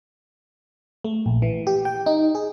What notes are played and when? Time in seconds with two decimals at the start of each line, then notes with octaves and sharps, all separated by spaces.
1.04 A3
1.26 A#1
1.42 E3
1.67 G4
1.85 G5
2.06 D#4
2.35 G#4